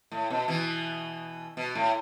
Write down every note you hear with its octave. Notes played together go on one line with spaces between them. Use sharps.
A2
B2
B2 E3
B2
A2